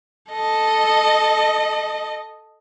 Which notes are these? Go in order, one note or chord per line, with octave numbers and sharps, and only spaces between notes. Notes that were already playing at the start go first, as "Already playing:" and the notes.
A4 D#5